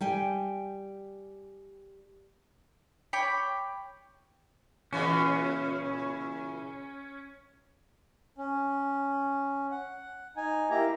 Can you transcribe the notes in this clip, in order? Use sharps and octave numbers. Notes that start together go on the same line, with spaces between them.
G3 G5 G#5
C#5 G5 B5 D6
A#2 C#3 E3 C#4
C#4
F#5
D#4 G#5
A#3 E4 G4 A#5